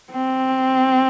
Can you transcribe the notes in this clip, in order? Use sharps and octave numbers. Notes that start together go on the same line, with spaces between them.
C4